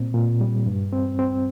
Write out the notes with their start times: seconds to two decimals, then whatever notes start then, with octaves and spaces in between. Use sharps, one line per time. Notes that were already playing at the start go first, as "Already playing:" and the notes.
Already playing: A#2 C4
0.14 A#2
0.41 G3
0.66 G2
0.92 C4
1.19 C4